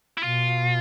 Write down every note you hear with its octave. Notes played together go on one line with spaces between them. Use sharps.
E4
B2 F4